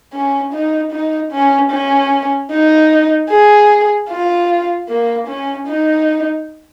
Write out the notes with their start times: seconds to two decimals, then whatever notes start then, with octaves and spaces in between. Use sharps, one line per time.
0.13 C#4
0.53 D#4
0.92 D#4
1.32 C#4
1.71 C#4
2.51 D#4
3.29 G#4
4.09 F4
4.88 A#3
5.27 C#4
5.67 D#4